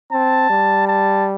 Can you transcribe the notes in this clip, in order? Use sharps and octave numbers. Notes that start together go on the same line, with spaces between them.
C4 A5
G3
A5